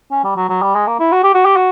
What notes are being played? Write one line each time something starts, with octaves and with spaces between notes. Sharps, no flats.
C#4
G3
F#3
F#3
G3
G#3
A#3
E4
F#4
G4
F#4
G4
F#4